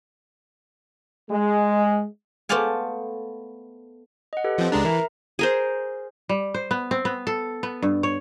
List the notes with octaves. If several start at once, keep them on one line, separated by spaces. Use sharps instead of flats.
G#3
A3 B3 C5 D5 F5 G#5
D#5 F#5
G4 A4 B4
F3 C4
C#2 G#3 D4 A#5
E3 A#4 E5 A#5
G#4 A#4 C5
G3
C5
B3
C4
B3
A4
B3
G2
C#5